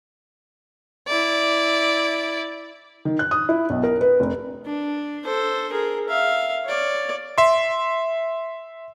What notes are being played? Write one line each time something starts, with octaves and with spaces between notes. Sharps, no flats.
E4 D5
D#3
F#6
D#6
E4
B1
A#4
B4
F1
D4
A4 C5
G#4 A#4
E5 F5
C#5 D5
E5 C6